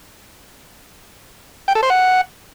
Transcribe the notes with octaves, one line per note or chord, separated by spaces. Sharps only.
G5
A4
C5
F#5